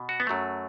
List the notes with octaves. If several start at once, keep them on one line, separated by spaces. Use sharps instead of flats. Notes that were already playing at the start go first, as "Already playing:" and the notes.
Already playing: B2
F#4
B3
F#2 F#3 A3